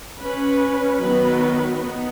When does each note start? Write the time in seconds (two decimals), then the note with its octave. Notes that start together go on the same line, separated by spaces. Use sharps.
0.21 C#4 B4
1.00 D#3 F#3 B3 F#4 B4
1.79 B3 D#4